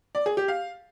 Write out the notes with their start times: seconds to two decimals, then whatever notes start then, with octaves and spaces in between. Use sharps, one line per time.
0.15 D5
0.26 G#4
0.37 G4
0.48 F5